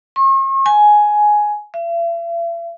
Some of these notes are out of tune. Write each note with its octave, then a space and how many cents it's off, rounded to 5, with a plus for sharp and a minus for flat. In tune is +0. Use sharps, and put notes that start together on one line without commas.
C#6 -45
G#5 +10
E5 +45